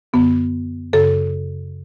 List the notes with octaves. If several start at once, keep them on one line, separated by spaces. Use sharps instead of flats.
F#2 D3 B3
F#2 C#3 A4